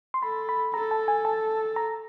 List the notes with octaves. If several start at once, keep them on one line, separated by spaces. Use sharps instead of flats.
C6
A4 B5
B5
A4 A#5
A5
G#5
A5
A#5